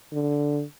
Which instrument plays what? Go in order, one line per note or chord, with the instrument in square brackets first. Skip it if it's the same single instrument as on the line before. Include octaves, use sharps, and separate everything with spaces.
[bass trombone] D3